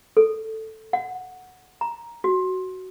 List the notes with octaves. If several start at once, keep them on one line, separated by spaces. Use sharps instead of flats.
A4
F#5
A#5
F#4